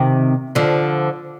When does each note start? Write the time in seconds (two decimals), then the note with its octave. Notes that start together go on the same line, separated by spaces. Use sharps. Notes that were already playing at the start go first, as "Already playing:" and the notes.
Already playing: C3 D#3
0.55 D3 F3